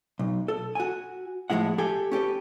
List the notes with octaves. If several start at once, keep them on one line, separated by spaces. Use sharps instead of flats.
B1
A4
F#4 G#5
A2 F3 G#3 E4 F#5
G4 A4 G#5
C#4 G4 A4 B4